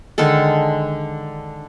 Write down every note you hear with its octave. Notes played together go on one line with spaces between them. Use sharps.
D3 D#3 G#3 A4